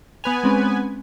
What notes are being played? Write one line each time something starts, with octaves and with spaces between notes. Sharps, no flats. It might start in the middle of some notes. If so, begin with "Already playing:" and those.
B3 B4 G#5 F7
G#3 C4 C#4